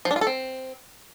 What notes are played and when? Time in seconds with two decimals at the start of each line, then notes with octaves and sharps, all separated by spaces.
0.05 F3
0.11 D4
0.16 F4
0.21 A4
0.27 C4